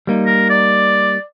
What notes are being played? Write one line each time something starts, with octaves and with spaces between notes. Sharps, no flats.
G3 A#3 D#4
A#4
D5